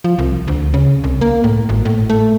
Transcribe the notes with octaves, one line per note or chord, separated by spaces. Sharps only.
F3
C2
D2
C#3
C2
A#3
A2
G#1
A2
A3